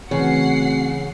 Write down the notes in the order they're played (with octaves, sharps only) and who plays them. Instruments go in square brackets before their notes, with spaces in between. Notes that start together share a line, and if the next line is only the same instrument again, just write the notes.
[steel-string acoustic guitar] C#3 [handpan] E3 C#5 [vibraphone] A3 C4 F#4 [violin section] F#5 C7